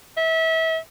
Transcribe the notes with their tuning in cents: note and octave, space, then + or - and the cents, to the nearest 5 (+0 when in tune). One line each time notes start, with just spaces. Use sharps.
E5 -30